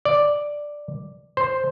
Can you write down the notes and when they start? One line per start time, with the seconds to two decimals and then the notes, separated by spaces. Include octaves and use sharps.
0.05 D5
1.37 C5